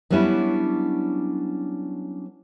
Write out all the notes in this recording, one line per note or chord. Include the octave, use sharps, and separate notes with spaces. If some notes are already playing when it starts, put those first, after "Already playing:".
F#3 G3 B3 C#4 D4 E4